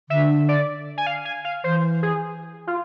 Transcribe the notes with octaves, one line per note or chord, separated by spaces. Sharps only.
D3 E5
D5
G#5
F5
G#5
F5
E3 C5
G#4
F4